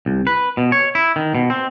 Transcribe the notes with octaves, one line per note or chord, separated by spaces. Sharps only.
C2
B4
B2
C#5
E4
D#3
B2
C4